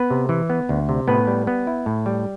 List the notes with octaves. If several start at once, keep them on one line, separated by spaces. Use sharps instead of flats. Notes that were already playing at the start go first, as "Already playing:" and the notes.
Already playing: B3 B4
C3
E3
B3
D2
C3
A2 B3 B4
G3
B3
E4
A2
G3